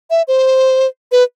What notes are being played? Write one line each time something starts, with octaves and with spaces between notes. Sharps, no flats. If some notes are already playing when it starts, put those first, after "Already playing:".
E5
C5
B4